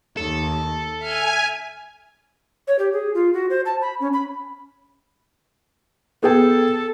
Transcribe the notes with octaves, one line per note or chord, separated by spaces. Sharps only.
D#2 A4
E5 G#5 F6
C#5
G4
G#4
F4
F#4
C5
A5
B5
C#4
B5
B3 G#4 A4 G5